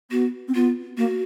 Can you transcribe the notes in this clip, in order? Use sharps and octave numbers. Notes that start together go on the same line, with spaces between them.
B3 F#4
C4
B3 F4
A#3 F#4